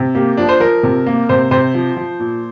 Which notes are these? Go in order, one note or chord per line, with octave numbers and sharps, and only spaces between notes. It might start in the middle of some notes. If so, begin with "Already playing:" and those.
Already playing: C3
A#3 G4
F3 D4
C5
F3 A#4
C3
A#3
C3 C5
C3 C5
F3
F3
A#2